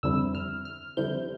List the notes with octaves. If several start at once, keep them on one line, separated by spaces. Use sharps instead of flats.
F2 D3 G3 C4 E4 E6
F6
F6
F2 D3 G3 C4 E4 G6